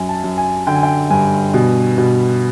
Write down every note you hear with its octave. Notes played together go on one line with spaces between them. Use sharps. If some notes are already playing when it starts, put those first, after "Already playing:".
Already playing: F#2 G#5
A5
F#2
G#5
D3 G5
G#5
G5
G2 G#5
B2
B2